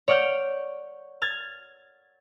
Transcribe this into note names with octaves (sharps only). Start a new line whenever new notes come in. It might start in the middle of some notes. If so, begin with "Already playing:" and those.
C#5 D5 F#5 F6 G6
F6 G#6 A6